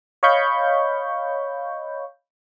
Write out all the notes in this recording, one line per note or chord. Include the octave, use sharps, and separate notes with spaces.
C#5 D#5 F5 B5 C#6 G6